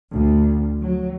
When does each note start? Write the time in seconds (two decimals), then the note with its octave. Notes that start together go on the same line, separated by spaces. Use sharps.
0.12 D2
0.82 F#3